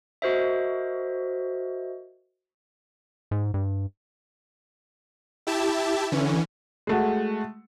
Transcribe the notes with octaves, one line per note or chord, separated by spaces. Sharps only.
F#4 A#4 C5 D#5 E5
G#2
G2
E4 G4 E5 A5
D3 E3 C#4
G#3 A3 F#4